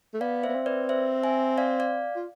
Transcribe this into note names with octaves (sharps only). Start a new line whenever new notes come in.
A3
B3 D5 F5
C5 E5
B3
C4
B4 D5
C5 E5
E5 G#5
D5 F5
D5 F5
F4